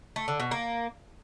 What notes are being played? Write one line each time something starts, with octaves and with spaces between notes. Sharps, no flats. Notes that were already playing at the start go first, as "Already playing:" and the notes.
A3
D3
B2
A#3